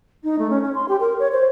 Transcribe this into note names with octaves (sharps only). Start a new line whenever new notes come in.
D#4
A3
C#4
C#4
C6
G4
A#4
C#5
C5